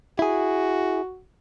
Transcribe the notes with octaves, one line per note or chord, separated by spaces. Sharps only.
E4 F#4 G#4